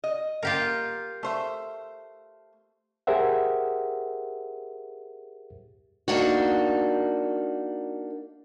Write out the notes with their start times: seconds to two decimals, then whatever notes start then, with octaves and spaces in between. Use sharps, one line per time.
0.04 D#5
0.43 A#3 F4 G4 A#4
1.23 A3 C5 E5
3.07 G4 G#4 A#4 C5 E5 F#5
6.08 A#3 D4 D#4 F#4